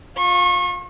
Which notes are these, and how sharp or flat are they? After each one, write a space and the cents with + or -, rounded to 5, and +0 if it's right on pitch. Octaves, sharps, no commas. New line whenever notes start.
F4 +20 C#6 -30